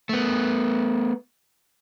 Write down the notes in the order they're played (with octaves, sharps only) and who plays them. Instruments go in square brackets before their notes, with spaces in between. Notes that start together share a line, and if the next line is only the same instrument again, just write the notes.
[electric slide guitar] A3 B3